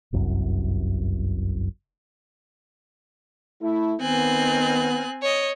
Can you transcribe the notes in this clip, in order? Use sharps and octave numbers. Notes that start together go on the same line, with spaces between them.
G1 C2 F#2
A3 E4
D#3 B3 C4 G#5 F#6
C#5 D#5